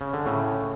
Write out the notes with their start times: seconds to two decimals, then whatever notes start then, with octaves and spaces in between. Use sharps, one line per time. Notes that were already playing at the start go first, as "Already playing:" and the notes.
0.01 C#3
0.13 D3
0.26 A2 C#3